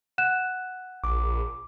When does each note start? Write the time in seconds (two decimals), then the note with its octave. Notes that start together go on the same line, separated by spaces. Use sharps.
0.18 F#5 F#6 E7
1.04 A#1 D6